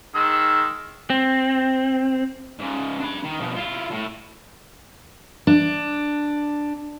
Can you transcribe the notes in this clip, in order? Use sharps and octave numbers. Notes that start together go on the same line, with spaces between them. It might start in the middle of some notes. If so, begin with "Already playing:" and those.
D#3 G#3 E6
C4
G#2 C#3
D4 B5
D#3
B2 F3
E4 F4
A2
D4